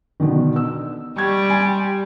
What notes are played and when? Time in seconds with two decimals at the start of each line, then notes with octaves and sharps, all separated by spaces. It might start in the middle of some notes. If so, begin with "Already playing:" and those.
0.20 B2 D3 D#3
0.56 E6
1.17 G3 C#6 G#6
1.50 G#5 C6